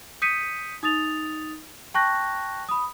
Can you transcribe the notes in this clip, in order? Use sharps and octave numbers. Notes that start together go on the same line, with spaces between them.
D#6 G6 B6 C#7 D#7
D#4 D#6 A6 F7
G5 A5 C#6 F#6 G6 A#6
B5 D#6